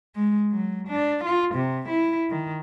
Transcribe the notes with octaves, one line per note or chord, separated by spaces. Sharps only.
G#3
F#3
D4
F4
C3
E4
D#3